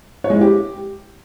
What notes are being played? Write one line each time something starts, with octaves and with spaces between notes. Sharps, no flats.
C#5
G#3
E4
G4